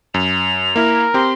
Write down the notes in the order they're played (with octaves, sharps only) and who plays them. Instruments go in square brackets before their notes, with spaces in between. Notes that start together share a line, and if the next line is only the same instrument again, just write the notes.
[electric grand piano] F#2 [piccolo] F7
[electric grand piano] A#3 E4 [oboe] A#4
[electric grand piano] C4 G4 [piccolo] C6